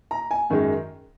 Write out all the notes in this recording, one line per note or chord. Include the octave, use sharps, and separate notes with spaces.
A#5
G#5
F#2 D#3 G#3